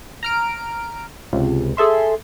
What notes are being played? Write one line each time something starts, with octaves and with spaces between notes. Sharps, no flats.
A#5 F6 D7
C#2 C3
G#4 A4 E5 C6